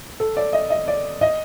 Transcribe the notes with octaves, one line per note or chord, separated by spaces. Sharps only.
A4
D5
D#5
D#5
D5
D#5